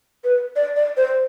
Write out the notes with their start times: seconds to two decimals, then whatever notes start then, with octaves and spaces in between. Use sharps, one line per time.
0.24 B4
0.56 D5
0.76 D5
0.97 C5